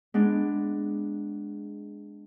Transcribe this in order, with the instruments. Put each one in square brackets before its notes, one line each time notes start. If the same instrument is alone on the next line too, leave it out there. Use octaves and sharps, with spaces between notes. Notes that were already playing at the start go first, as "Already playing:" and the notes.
[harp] G#3 B3 D4